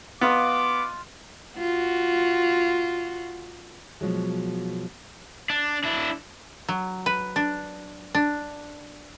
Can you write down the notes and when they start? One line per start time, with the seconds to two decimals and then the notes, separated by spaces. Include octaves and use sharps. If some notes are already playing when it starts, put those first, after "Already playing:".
0.21 B3 F4 D#5 F5 D6
1.58 F4 F#4
4.01 B2 F3 F#3 G#3
5.50 D4
5.84 D4 E4
6.68 F#3
7.06 B4
7.36 D4
8.15 D4